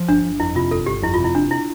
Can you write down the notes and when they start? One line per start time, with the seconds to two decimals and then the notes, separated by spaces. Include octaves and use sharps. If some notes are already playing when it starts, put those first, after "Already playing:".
Already playing: F3
0.08 G1 D4
0.23 G1
0.40 F2 E4
0.55 C3 F4
0.71 G1 A4
0.86 G1 G4
1.02 F2 E4
1.14 C3 F4
1.24 E4
1.35 F1 D4
1.51 E4